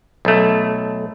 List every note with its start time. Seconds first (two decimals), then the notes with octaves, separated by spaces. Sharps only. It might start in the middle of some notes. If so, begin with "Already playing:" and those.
0.25 B1 A3